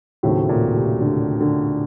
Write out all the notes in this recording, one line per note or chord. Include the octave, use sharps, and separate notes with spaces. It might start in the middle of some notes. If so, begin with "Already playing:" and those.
D#2 A2 C#3 F#3 A3 C4
A#2
C3
D3
D3